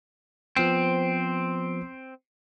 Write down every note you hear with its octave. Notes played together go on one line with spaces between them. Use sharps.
F3 B3 C4 C5